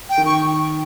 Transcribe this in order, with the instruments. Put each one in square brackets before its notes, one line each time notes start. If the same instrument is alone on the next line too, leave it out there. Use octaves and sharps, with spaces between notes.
[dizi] G5
[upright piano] D#3
[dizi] C#6